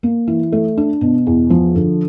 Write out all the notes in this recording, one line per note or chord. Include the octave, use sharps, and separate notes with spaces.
A#3
E3
A3
D4
B2
E2
F3
D3